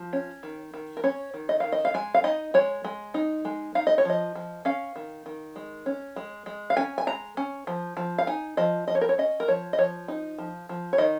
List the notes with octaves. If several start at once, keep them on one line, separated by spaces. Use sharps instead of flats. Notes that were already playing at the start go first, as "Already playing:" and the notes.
Already playing: F3
C#4
D#3
D#3
A#4
C#4 C#5
D#3
D#5
D#3 F5
D#5
F5
G#3 G#5
F5
D#4 D#5
G#3 C#5
G#3
D#4
G#3
D#4 F5
D#5
C#5
F3 D#5
F3
C#4 F5
D#3
D#3
G#3
C#4
G#3
G#3
F5
C#4 G#5
G#5
G#3 A#5
C#4
F3
F3
F5
D#4 G#5
F3 D#5
F3 D#5
C#5
A#4
C#5
C#4 D#5
A#4
F3 C#5
D#5
F3 C#5
D#4
F3
F3
C#5
D#3 D#5